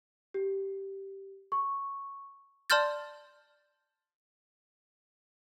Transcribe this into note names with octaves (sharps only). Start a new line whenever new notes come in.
G4
C#6
D5 A5 C6 F6 G6 A6